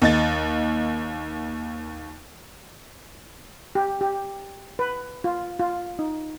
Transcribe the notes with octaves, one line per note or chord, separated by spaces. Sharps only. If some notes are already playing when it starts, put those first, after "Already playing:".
D#2 D#5 A6
G4
G4
B4
F4
F4
D#4